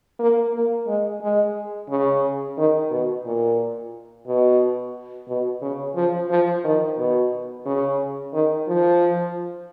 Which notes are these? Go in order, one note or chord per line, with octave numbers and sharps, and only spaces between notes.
A#3
A#3
G#3
G#3
C#3
D#3
B2
A#2
B2
B2
C#3
F3
F3
D#3
B2
C#3
D#3
F3